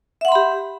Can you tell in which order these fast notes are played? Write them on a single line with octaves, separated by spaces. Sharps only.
E5 F#5 C6 B5 G4